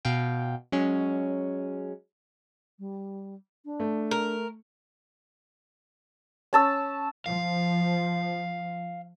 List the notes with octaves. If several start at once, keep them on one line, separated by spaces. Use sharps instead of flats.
B2 F5 G5
F#3 G#3 C#4
G3
D4
A3
A#4
C#4 A5 E6
F3 F5